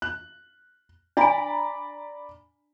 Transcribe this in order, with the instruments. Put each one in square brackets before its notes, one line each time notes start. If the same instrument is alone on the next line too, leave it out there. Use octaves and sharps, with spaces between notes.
[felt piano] F#6
[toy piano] D4 G#5 [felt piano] D5 A#5 B5